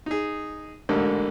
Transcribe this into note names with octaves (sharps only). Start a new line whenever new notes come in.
D#4 G#4
A1 G#2 D3 A#3